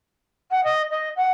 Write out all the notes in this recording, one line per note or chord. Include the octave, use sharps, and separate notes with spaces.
F#5
D#5
D#5
F#5